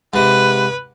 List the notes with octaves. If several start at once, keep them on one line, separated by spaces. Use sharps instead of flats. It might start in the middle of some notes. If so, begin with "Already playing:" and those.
G#2 C3 B4